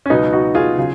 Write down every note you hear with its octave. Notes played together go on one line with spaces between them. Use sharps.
C#4
C#2 B2 F#3 B3 D#4
D#4 F#4
F4 G#4
C#3 F#3